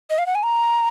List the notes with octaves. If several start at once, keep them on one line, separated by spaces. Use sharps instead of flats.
D#5
F5
F#5
G#5
A#5